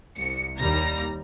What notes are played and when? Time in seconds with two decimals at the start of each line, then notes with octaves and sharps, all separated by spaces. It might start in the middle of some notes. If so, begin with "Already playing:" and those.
0.19 C2 C#7
0.58 D#2 G3 A#5 A#6